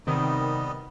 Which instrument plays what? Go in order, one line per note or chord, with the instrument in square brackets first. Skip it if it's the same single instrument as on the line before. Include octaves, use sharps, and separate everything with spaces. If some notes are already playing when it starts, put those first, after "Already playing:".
[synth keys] C3 D#3 [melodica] G3 B3 D#5